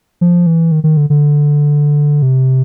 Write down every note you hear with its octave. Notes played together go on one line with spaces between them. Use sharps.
F3
E3
D#3
D#3
D3
D3
C3